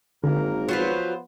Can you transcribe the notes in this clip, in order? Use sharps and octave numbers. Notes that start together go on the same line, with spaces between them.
G#1 F#2 D3 A#3 A#4
F3 F#3 B3 F4 B4 C5